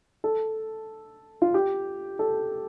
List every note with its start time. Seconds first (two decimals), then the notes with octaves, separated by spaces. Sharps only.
0.24 A4
1.42 F4
1.54 G4
2.19 A4